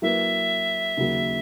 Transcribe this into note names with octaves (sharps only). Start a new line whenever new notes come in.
F#3 A#3 E4 B4 E5
D#2 C#3 F#3 A#3